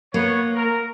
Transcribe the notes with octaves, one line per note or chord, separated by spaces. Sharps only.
A#3 B3 C#5
A#4